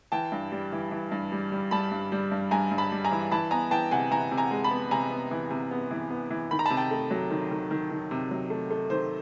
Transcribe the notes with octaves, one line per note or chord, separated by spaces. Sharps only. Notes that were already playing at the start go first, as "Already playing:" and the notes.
E3 G5 A5
G2
G3
E3
E3
G2
G3
G3
G3 A5 B5
G2
G3
G2
G2 G#5 A#5
G2
A5 B5
G3
G#5 A#5
E3
E3 A5 B5
B3 G#5 A#5
E3 G5 A5
C3 F#5 G#5
E3 G#5 A#5
C3
G#5 A#5
G#3
A5 B5
B3
C3 G#5 A#5
B3
E3
C3
B3
E3
B3
E3
D#3 B5
A#5
C3 A5 B5
G5 A5
A3
F#3
D#3
D#3
D#3
D#3
C3
F#3
A3
A3
D#3 C5